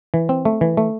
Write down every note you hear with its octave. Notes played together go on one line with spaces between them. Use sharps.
E3
C4
A3
E3
A3